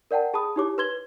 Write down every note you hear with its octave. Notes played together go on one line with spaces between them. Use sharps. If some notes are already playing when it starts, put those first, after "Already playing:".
A#4 D5 F#5 G5 A5
G#4 A5 B5 D#6
D#4 E4 G4 C#5 D6
B4 C6 G#6 G7